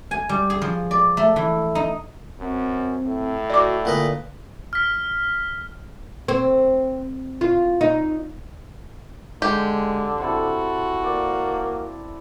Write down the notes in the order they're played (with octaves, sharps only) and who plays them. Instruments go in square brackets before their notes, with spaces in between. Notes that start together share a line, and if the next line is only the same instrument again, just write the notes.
[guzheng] G#5
G3
G#4
F3
D5
A3
E3
D#4
[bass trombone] F#2 [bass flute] C4
[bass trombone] A2
[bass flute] F#4 [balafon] D5 D6
[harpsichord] A#2 B4 D#5 [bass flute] D3
[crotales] F6 B6
[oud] C4
F4
D#4
[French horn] D3 [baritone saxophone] G#3 [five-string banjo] G4
[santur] C4 E4 A4 [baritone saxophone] F#4
[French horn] A#3 [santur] D5